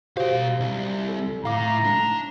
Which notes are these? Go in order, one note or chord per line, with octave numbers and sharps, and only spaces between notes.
B2 F#4 G4 C5 F5
C2
A4
A2 F5 A#5 D6
D4